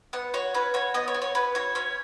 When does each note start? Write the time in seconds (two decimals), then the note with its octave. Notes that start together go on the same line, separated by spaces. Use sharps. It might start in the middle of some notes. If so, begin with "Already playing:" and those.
0.13 B3 F#5
0.34 F#4 C#5
0.54 C#4 B4
0.74 F#4 C#5
0.94 B3 D#5
1.08 C#5
1.14 F#4
1.22 C#5
1.35 C#4 B4
1.55 F#4 C#5
1.75 C#4 C#5